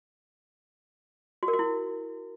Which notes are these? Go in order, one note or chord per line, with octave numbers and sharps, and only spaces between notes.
F#4
A#4
F#4
E4